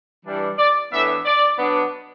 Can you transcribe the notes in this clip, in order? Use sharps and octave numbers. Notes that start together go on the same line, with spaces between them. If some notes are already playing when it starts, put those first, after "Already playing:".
E3 G3 D4
D5
A2 E3 B3 D4 E5
D5
B2 F#3 B3 D4